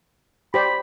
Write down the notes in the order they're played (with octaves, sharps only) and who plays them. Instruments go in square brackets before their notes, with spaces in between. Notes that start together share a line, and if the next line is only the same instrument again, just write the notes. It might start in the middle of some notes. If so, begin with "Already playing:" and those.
[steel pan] G4 C5 D5 [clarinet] B5